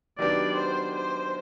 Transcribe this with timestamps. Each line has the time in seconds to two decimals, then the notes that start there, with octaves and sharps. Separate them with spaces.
0.19 D#3 F#3 B3 D4 G4 D5
0.57 C5
0.95 C5